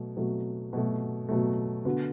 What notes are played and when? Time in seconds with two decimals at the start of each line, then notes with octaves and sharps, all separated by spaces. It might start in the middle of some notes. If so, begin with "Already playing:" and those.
Already playing: B2 F#3 A3
0.17 B2 F#3 A3
0.73 B2 F#3 A3
1.29 B2 F#3 A3
1.85 D3 B3 F#4